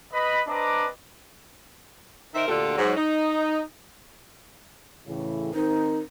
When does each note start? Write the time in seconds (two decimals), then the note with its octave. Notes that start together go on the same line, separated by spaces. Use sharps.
0.13 B4 D#5 B5
0.48 C4 D4 B4 D#5 A#5 D6
2.35 D#3 D#4 A#4 C5 E5
2.48 D2 A#2 D3 F4 G4 A4
2.78 G#2 F#3
2.97 D#4
5.07 A2 C#3 E3
5.54 D#3 C4 D#4 A#4